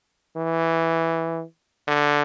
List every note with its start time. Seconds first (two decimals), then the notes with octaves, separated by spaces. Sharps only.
0.37 E3
1.88 D3